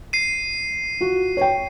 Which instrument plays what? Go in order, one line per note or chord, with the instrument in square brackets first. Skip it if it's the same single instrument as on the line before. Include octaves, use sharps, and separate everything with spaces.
[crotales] C7 D#7
[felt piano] F4 F#4
C#5 G5